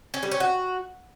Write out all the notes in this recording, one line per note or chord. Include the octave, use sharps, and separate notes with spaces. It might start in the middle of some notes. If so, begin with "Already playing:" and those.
C#4
G3
C#4
F#4